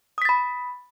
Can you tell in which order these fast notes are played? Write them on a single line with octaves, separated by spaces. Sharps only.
D#6 B6 A6 B5